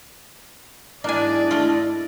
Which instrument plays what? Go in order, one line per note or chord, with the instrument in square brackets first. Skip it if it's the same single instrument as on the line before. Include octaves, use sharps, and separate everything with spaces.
[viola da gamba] G#2 D5 D#5 [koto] A#3 G#5 [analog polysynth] D4 [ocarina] E4
[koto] A3 F4